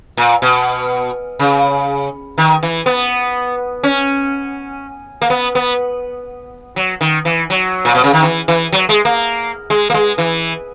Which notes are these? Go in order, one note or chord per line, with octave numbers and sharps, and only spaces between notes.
A#2
B2
C#3
D#3
E3
B3
C#4
A#3
B3
B3
F#3
D#3
E3
F#3
A#2
B2
C#3
D#3
E3
E3
F#3
G#3
A#3
G#3
A#3
G#3
E3